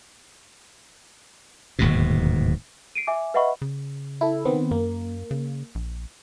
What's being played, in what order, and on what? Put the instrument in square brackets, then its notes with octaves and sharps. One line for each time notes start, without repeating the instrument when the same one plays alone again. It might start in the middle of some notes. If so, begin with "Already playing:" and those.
[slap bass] D1 D#2 G#2 B2
[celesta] C7 D7 D#7
E5 G#5 D6
B4 D#5 E5 F#5 B5 C#6
[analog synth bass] C#3
[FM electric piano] E4 A4
D#3 B3 C4
[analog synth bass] F#2 [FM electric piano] A#3
[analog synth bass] C#3
A#1